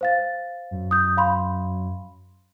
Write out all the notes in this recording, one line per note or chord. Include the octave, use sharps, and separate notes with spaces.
C5 F5 A6
F#2
D#6 G6
F5 B5 C6